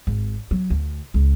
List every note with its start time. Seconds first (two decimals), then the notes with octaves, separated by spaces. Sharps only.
0.07 G#1
0.51 F#3
0.70 D2
1.14 C#2